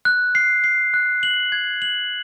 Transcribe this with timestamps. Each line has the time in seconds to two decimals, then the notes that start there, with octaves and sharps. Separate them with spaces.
0.05 F#6
0.35 C7
0.64 C7
0.94 F#6
1.23 F#7
1.52 G#6
1.82 F#7